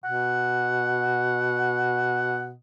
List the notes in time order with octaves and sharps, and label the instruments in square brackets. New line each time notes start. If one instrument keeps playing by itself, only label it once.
[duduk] B2 [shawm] F#5